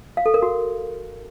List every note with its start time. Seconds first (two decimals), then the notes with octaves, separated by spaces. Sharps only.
0.17 F5
0.26 A4
0.34 A#4
0.42 F#4